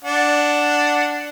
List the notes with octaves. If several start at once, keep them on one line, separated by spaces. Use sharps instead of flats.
D4 F#5